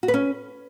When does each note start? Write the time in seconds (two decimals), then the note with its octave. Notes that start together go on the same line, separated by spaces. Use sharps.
0.03 F#4
0.08 B4
0.14 C#4